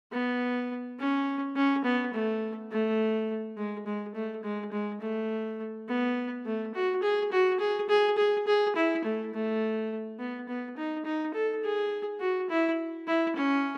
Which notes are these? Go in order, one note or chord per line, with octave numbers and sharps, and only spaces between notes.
B3
C#4
C#4
B3
A3
A3
G#3
G#3
A3
G#3
G#3
A3
B3
A3
F#4
G#4
F#4
G#4
G#4
G#4
G#4
E4
A3
A3
B3
B3
D#4
D#4
A4
G#4
F#4
E4
E4
C#4